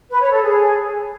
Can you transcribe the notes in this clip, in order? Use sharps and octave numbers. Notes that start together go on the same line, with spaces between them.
B4
C#5
A4
G#4